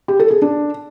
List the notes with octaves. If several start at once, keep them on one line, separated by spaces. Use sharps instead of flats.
G4
A4
G#4
D4